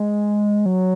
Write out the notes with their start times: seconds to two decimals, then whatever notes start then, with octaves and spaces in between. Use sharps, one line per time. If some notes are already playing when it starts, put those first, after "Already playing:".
Already playing: G#3
0.66 F#3